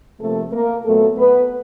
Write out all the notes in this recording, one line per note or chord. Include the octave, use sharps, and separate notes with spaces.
C3 F3 A3 A#3 A4
A#3 A#4
A#2 F#3 A3 B3 A4
B3 B4